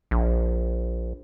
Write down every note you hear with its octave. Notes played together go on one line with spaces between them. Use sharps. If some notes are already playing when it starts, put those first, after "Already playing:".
A#1